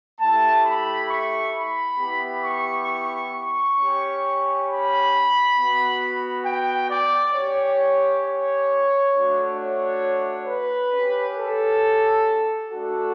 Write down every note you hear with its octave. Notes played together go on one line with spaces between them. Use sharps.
A3 E4 G4 A5
B5
C#6
B5
B3 E4 G4
C#6
C#6
C#6
C#4 G4
B5
B3 F#4
G5
D5
C#4 G4 C#5
C#5
A3 D4 F#4
C#5
B4
C#4 G4
A4
A3 D4 F#4 A4